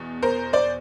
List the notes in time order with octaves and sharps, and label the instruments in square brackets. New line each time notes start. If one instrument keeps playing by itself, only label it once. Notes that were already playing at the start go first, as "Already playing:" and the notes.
Already playing: [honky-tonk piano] E2 B2
A#4 C5
C5 D5